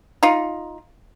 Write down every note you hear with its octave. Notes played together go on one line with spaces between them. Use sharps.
D#4 F4